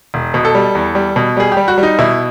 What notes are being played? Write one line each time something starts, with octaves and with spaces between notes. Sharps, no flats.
E1
B2
A4
G3
E2
G3
B2
G3 G#4
G4
G3
F#4
G3
D#4
B2 E4